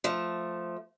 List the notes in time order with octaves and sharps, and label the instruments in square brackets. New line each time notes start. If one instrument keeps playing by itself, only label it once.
[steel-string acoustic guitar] F3 A3